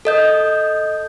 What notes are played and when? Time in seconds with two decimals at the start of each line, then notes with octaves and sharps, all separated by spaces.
0.05 A4 D#5 G6